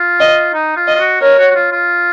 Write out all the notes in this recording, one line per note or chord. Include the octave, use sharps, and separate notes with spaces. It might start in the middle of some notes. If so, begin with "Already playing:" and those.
Already playing: F4
D#5
D#4
F4
D#5
F4
F#4
A#4 C#5
F#4
F#4
F4
F4